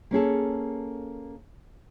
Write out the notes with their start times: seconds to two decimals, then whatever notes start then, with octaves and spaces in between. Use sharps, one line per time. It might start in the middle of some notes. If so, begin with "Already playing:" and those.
0.11 A#3 C#4 G#4 A4